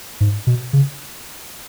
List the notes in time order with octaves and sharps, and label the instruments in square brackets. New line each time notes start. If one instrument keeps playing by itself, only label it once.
[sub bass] G#2
B2
C#3